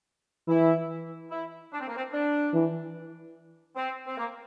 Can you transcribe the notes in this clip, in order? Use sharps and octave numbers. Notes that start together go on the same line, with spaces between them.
E3 E4
E4
D4
C4
A#3
C4
D4
E3
C4
C4
A#3